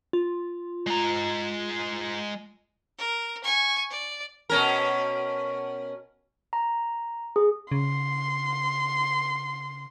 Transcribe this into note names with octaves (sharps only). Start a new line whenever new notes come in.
F4
G#3 A#5
A#4
G#5 C#6
D5
B2 C#4 A#4
A#5
G#4
C#3 C6